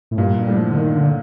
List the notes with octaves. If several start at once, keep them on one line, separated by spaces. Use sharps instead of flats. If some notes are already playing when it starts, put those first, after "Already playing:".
A2
G2 A#2
G2
A2 G3
F3
D3
D#3
D3